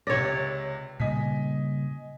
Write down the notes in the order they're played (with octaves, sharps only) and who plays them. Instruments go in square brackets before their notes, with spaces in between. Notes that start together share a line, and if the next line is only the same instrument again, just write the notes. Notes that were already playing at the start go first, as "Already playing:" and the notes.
[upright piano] C#2 C3 A#6 [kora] C#5 D5
[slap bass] A#2 C#3 G3 [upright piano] D#5 G#5 B6